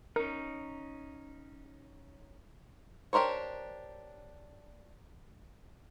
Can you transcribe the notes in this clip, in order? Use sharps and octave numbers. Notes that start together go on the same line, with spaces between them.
C#4 D#4 A#4
D4 G4 A#4 C5 C#5